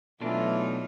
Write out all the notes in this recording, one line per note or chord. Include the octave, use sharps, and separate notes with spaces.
B2 E3 F#3 A3 D4 D#4 F4